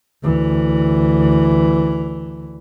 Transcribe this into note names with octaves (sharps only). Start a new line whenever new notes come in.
D2 E3